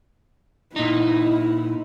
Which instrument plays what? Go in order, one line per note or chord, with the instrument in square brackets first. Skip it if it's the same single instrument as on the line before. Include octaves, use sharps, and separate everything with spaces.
[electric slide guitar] A#2 D#4 [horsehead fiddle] E4